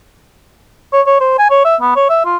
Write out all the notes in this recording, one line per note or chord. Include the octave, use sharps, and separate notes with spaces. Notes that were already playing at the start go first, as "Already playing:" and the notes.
C#5
C#5
C5
G#5
C#5
E5
B3
C#5
E5
F4